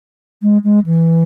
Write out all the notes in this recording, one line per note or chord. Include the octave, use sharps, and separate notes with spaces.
G#3
G#3
E3